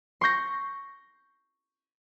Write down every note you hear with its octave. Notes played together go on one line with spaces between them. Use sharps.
C6 C#6 G6 A#6